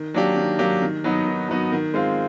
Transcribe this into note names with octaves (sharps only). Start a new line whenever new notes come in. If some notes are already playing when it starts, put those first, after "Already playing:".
Already playing: D#3
F#3 A#3 D4 G4
D#3
F#3 A#3 D4 G4
D#3
F#3 B3 D#4 F#4
D#3
F#3 B3 D#4 F#4
D#3
G#3 C4 F4